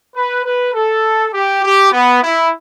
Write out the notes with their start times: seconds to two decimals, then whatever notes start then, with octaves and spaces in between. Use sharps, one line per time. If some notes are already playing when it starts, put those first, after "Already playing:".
0.16 B4
0.45 B4
0.74 A4
1.33 G4
1.63 G4
1.93 B3
2.23 E4